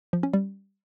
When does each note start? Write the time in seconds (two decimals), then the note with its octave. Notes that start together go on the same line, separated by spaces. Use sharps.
0.13 F3
0.23 C#4
0.33 G3